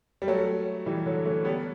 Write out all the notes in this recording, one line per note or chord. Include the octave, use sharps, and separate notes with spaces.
G3
F#3 A3
E3 G3
D3 F#3
A3 C#4
G3 B3